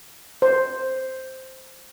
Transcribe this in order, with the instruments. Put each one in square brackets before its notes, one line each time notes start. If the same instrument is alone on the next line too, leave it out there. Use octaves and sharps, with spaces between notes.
[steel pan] C5